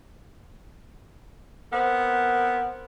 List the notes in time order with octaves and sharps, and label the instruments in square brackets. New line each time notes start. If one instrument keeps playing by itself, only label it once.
[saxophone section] B3 C4 A#4